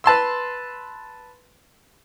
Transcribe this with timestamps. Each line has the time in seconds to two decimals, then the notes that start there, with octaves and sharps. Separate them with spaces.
0.04 B4 A5 C6 E6